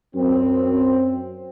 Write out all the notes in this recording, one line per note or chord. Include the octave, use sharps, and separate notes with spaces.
F#2 C4